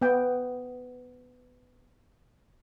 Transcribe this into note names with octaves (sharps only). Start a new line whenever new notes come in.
B3 G5